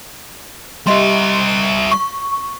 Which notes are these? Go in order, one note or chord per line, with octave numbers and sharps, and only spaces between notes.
G3 G4 D#5 E5 C6
E7
C#6